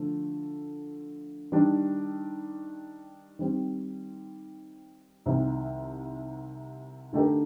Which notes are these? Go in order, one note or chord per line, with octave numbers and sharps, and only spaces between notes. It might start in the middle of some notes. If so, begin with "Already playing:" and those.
Already playing: D3 F3 A3
D#3 G3 D4
D#3 G3 C4
C2 C3 D#3
D3 A3 D#4 G4 A#4